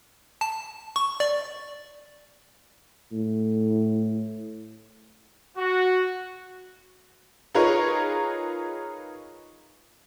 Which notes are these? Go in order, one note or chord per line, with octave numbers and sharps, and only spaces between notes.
A5
C#6
D5
A2
F#4
D#4 F4 G#4 A#4 B4 C#5